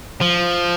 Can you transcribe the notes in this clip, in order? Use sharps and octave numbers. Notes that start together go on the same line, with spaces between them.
F3